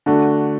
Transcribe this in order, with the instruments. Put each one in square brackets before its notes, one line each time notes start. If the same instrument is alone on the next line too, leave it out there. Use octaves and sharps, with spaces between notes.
[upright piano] D3 A3 [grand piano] D4 F#4